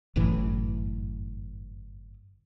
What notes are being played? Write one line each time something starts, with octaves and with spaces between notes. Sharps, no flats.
G1 F#2 A2 E3